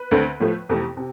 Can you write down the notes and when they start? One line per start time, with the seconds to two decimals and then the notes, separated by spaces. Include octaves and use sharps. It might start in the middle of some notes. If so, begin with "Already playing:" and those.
Already playing: B4
0.11 D2 D3 A3 C4
0.40 A2 F3 A3
0.69 F2 C3 E3 A3
0.97 C3